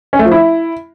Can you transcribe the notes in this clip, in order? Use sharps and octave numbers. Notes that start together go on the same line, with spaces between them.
C#4
A3
F3
E4